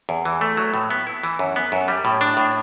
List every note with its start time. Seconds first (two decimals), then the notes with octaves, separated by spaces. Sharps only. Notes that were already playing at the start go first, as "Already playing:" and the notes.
0.09 E2
0.25 E3
0.41 A3
0.57 F#3
0.74 A2
0.90 B3
1.07 E4
1.23 E3
1.39 F#2
1.56 B3
1.72 F#2
1.88 G3
2.05 A2
2.21 D4
2.37 A2